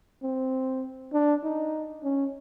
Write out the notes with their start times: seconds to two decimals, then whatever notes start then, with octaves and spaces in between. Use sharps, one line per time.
0.23 C4
1.13 D4
1.44 D#4
2.03 C#4